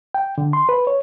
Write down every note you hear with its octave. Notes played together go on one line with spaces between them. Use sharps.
G5
D3
C6
B4
C#5